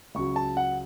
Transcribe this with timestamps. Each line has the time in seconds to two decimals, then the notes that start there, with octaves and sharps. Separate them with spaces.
0.15 C#2 C#3 F#3 C#6
0.36 A5
0.57 F#5